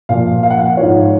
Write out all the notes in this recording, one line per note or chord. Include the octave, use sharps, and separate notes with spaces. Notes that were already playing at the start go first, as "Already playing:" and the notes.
A#2 F3 F5
F5
F#5
F5
G#2 F3 C#5